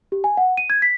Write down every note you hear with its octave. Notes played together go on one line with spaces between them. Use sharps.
G4
G#5
F#5
D#7
G#6
B6